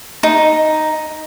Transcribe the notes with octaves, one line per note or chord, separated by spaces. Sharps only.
D#4